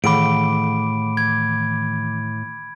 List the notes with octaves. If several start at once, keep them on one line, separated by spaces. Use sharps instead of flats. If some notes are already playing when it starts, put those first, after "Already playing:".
A2 D#3 E3 B5 D6 D7
G#6